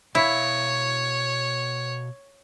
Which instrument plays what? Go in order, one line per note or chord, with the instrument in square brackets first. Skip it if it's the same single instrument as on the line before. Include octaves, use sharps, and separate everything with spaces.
[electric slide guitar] B2 F5 [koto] E4 [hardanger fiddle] C#5